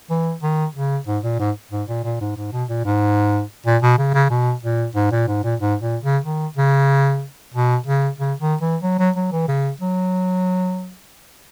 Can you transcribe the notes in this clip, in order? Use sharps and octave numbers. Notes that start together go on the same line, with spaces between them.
E3
D#3
C#3
G#2
A#2
G#2
G#2
A#2
A#2
G#2
G#2
B2
A#2
G#2
A#2
B2
C#3
C#3
B2
A#2
G#2
A#2
G#2
A#2
G#2
A#2
C#3
D#3
C#3
B2
C#3
C#3
D#3
E3
F#3
F#3
F#3
E3
C#3
F#3